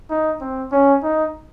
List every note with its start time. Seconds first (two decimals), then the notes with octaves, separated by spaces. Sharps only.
0.10 D#4
0.41 C4
0.72 C#4
1.03 D#4